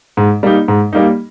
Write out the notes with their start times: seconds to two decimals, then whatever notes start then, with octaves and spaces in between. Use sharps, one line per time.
0.17 G#2
0.43 G3 A#3 D#4
0.68 G#2
0.93 G3 A#3 D#4